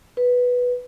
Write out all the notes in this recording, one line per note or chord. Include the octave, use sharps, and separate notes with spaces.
B4